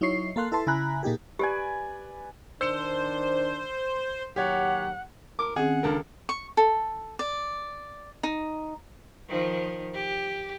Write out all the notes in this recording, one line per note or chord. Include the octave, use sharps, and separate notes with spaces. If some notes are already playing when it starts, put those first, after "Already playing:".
F#3 D#4 E4 C#5 C#6 C7
A#3 A4 F5 C6 F#6
E4 A4 B4 E5 A5 C6
C#3 E4 G#5 A#5 B5 F#6
A#2 A#3 D#4 G4 G#4
G4 B4 D5 G#5
D#3 D4 C5 E6 C#7 E7
D#2 F#3 G4 C#5 F#5
A#4 D6
D#3 C4 C#4 G#4 F#5
C#2 D4 A4 A#4
C#6
A4
D5
D#4
D#3 F3
G4